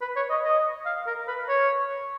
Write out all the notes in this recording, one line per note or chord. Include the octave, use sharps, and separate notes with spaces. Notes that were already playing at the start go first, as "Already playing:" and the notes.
B4
C#5
D#5
D#5
F5
A#4
B4
C#5